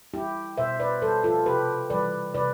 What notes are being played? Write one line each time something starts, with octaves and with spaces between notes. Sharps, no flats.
G3 E4 G4
B2 C5 E5
B4 D5
G3 A4 C5
F4 A4
C3 G4 B4
E3 G3 B4 D5
C3 B4 D5